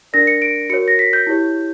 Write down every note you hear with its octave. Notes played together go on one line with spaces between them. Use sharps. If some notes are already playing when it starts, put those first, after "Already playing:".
D4 A#4 D5 A#6
C#7
D7
F#4 A#4 C#5 C#7
A#6
B6
G6
E4 G4 C#5